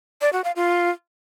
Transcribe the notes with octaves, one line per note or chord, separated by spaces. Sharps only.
D5
F#4
F5
F4